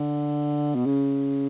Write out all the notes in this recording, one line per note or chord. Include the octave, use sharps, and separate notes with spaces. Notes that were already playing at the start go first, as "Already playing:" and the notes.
Already playing: D3
B2
C#3